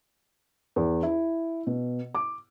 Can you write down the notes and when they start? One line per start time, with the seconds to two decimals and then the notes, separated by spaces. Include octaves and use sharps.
0.76 E2
1.03 E4
1.67 B2
2.15 D6